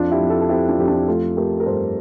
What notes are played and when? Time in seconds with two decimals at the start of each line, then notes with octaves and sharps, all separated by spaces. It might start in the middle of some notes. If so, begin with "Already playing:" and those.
Already playing: F2 D4 F4
0.11 E4 G4
0.20 F2
0.30 F4 A4
0.41 A4
0.49 C4 E4 G4
0.69 D4 F4
0.79 F2 G4
0.88 D4 F4
1.07 A3 F4 A4
1.37 A3 G4 A#4
1.60 A#4
1.66 G2 A4 C5